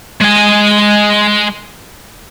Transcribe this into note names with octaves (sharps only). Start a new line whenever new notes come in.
G#3 G#5